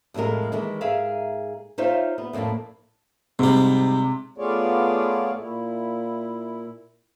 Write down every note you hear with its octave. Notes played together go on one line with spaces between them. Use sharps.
F2 A2 D#3 G#3 A#4
D#3 E3 G#3 A#4
G#2 G#4 A#4 E5 F5
D#4 F4 C5 C#5 E5 F5
B3
F2 A2 A3 A#3 D4
G#2 C3 G3
A3 B3 F4 G#4 C#5 D5
A#2 E4